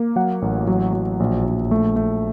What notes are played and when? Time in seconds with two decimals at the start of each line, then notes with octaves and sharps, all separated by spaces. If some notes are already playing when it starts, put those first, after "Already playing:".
Already playing: A#3
0.16 F#3 F#5
0.42 A1
0.67 F#3
0.93 F#3
1.20 A#1
1.46 A#1
1.71 A3
1.96 A3